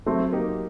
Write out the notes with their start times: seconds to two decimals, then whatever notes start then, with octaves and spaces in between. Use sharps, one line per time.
0.06 F#3 A3 C4
0.32 A#3 D#4 G4